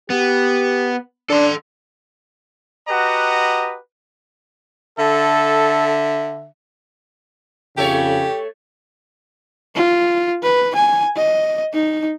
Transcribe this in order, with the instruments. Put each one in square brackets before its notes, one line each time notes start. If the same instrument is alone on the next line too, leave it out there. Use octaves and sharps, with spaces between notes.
[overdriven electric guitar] B3 [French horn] G4
[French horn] D4 [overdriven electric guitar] A4 C6
[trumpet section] F#4 G4 B4 D#5 F#5 A#5
[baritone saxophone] D3 [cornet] A4 [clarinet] E5
[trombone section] F2 C#3 [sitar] A3 A4 C#5 [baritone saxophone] G4
[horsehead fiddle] F4
B4
G#5
D#5
D#4